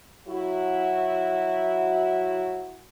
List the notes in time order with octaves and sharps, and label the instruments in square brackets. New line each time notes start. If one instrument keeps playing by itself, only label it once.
[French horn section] F#3 E4 F#4